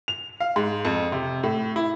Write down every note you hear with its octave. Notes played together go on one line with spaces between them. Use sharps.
F7
F5
G#2
F2
C3
A2
E4